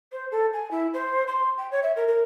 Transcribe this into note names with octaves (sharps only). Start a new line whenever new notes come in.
C5
A4
G#5
E4
C5
C6
G5
C#5
E5
A#4
A#4